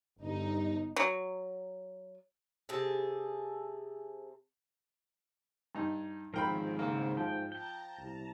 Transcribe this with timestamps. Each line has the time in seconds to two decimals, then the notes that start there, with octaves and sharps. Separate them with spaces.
0.19 G1 G2 D#4
0.96 F#3
2.69 C3 G#4 A4
5.75 G2 D#4
6.34 G#2 D#3 F3 C4 A#4 G5 B5
6.79 C#3 A#3 C4
7.17 F3 G5
7.52 G5 A5 A#5
7.98 C2